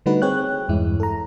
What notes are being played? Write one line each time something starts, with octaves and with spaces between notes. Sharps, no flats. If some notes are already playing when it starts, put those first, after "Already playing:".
D3 G3 A3 D#4 F#4 B4
C4 G#4 C#5 G5 F#6
E2 G2 G#3 E4
A4 A#5